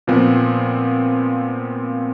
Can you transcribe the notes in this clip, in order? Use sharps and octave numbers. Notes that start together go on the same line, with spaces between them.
A#2 F3 B3 C4